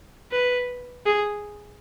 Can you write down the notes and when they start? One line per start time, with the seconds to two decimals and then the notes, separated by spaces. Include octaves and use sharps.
0.32 B4
1.06 G#4